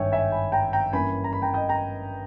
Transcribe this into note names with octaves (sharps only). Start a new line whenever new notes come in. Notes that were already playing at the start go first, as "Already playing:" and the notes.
Already playing: G#1 G2 D#3 C#5 E5 G5 G#5
E5 G#5
G#5 B5
G5 A#5
G5 A#5
G2 E3 A#3 C#4 G#5 B5
A#5
B5
G5 A#5
D#5 G5
G5 A#5